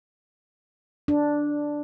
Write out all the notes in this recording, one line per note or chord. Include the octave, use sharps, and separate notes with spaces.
D4